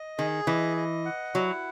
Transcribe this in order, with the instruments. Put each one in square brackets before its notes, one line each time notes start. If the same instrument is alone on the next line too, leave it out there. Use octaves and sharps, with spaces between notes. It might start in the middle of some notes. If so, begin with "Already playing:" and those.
Already playing: [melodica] D#5
[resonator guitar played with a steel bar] D#3 [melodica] G#4
[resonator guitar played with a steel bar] E3 [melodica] D#5
[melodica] D#5
F#5
[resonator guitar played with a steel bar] F#3 [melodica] E4